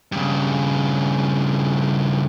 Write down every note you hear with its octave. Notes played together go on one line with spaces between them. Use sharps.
G2 C#3